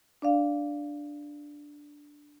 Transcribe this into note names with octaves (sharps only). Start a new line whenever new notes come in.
D4 D5 F5